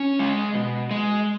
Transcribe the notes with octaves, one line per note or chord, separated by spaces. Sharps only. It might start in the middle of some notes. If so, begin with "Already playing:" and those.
Already playing: C#4
G#3
B2
G#3